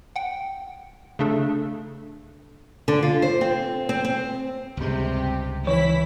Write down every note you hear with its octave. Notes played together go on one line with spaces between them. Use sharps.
F#5 G5
C#3 A3 D4 A4
D3
F4
C5
C4
C4
C4
C#2 G2 C3 G#3 G4
E3 E4 C#5 B6